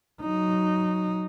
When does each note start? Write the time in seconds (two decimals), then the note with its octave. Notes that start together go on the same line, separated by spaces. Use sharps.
0.21 F#3 D#4